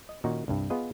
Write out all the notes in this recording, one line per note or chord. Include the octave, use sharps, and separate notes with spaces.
D#5
A#2 D#3 C#4 D#4 F#4
C2 G2
B3 F4 G#4 B4 D#5